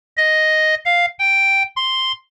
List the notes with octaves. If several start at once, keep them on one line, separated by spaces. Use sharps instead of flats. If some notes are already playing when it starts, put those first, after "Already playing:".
D#5
F5
G5
C6